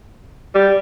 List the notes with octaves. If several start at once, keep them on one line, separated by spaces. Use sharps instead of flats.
G3